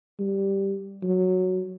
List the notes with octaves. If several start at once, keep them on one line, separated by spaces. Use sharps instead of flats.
G3
F#3